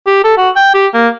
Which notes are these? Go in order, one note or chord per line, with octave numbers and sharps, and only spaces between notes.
G4
A4
F#4
G5
G4
A#3